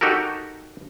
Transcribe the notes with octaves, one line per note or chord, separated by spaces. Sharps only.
D#4 F#4 G4 A4 A#4